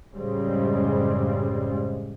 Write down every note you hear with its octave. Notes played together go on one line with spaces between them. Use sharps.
F#2 A2 C#3 G3 G#3 C4